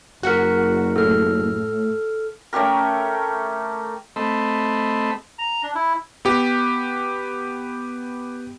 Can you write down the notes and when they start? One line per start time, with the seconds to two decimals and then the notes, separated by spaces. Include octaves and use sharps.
0.23 F#1 F#4 A#4 F#5 F#6
0.96 A2 A4 F6
2.53 A3 C#4 G4 A#4
4.16 A3 C4 A4 D#5 B5 C6
5.39 A#5
5.63 D4
5.75 E4
6.25 B3 G4